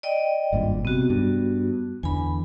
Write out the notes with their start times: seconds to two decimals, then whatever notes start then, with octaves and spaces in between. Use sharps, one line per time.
0.03 D5 D#5 G5
0.52 G#1 G2 A#2
0.85 C3 B3 F#4
1.10 G2
2.03 E2 D3 G#5 B5